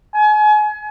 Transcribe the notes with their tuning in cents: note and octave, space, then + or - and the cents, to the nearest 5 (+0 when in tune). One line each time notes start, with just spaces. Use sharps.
G#5 +35